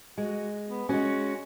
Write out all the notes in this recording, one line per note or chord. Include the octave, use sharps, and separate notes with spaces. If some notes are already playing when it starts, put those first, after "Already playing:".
G#3 F#4
B3
G#3 C#4 F#4